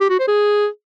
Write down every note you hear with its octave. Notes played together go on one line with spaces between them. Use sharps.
G4
F#4
C5
G#4